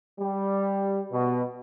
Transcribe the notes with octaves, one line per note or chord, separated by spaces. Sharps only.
G3
B2